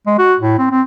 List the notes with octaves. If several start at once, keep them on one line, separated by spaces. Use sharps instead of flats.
G#3
F#4
A2
C4
C4